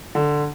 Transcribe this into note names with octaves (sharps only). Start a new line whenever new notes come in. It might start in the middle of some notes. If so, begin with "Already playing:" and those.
D3